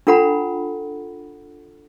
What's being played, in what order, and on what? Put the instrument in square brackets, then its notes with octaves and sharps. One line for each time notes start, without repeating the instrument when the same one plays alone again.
[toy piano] D4 F4 A4 F#5 A#5 B5